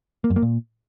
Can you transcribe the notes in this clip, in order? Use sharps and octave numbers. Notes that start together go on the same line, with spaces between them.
A#3
F#2
A#3
A#2